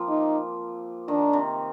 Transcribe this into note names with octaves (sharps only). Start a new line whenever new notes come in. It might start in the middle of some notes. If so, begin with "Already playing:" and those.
Already playing: F3 A#3 C4
D#4
D#3 D4
C3